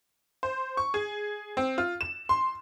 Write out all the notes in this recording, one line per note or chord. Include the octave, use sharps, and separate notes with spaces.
C5
C#6
G#4
C4
F4
E7
C6